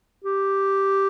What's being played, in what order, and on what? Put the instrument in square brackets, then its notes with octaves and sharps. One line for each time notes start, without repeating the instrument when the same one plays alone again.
[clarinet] G4